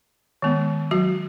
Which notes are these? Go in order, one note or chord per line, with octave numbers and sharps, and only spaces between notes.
D#3 G#3 B3
F#3 F#4